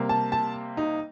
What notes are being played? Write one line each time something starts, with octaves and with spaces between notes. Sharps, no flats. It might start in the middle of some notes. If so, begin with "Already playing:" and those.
Already playing: C3 G3 A#3
A5
A5
D#4